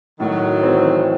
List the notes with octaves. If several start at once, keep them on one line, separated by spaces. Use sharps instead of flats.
A2 D#3 F#3
E3 C4